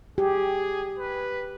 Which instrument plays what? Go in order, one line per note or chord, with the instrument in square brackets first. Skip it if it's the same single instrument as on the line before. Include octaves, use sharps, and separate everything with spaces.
[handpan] G4 [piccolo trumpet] G#4
[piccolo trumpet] B4